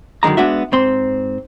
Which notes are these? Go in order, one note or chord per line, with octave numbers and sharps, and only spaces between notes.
F#2 D3 D#3 G#3 A#5
G#3 B3 D4 F#4 E5
G#2 C4 C6